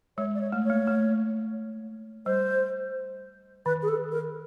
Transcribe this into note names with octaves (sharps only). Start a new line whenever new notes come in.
G#3 C#5
D5
C#5
A3
C#5
A#3
A3
G3 C5
D#3 B4
G#4
A4
A#4